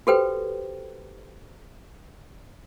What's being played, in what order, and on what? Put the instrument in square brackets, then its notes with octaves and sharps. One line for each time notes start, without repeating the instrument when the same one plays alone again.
[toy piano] F#4 G4 A4 B4 C5 G5